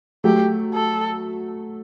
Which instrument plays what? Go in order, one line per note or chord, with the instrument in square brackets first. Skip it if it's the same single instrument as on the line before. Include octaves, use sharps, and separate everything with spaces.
[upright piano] F#3 A3 [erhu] G4
[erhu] A4